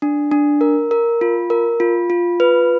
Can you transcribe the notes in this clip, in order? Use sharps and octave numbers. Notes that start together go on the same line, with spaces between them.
D4
D4
A#4
A#4
F4
A#4
F4
F4
B4